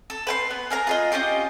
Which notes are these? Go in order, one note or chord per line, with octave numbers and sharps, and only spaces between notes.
A4
B4 G5 C6
B3
G#4 A#4 A#5
F4 G#4 D#5
C#4 F4 G4 D#5